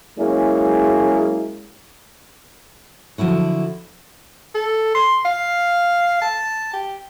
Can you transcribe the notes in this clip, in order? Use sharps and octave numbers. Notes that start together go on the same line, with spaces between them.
F#3 G#3 A#3 C#4 E4 G#4
D3 F3 F#3 E4 F#4
A4
C6
F5
A5
G4